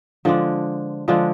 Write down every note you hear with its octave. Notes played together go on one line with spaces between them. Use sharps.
D3 F3 G#3 D4
D3 F3 G#3 D4